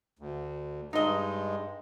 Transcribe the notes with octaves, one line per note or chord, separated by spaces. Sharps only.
D2
G2 G#3 D#4 D#5